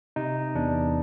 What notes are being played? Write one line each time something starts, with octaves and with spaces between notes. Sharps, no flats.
C3 D#4
E2 D4